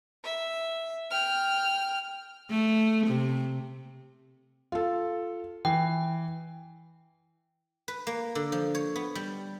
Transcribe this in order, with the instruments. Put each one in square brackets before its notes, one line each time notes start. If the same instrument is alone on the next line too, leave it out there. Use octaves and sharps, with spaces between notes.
[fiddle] E5
G5 F6
[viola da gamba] A3
C3
[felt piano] F4 A4
[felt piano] E3 [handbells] G5
[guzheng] B4
A#3
D3
F3
C#5
B3
G3